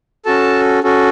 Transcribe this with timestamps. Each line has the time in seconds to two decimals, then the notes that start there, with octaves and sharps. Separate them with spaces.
0.25 C#4 F#4 A4 A5
0.83 C#4 F#4 A4